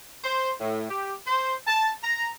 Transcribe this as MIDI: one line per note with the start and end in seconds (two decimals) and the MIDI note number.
0.24 0.52 72
0.61 0.85 45
0.89 1.13 67
1.27 1.54 72
1.67 1.91 81
2.04 2.28 82